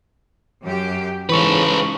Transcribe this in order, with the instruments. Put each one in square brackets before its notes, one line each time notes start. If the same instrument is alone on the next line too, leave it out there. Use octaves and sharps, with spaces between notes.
[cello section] F#2 G4
[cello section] G#2 C#3 [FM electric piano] E3 C#6 [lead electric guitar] A4 B4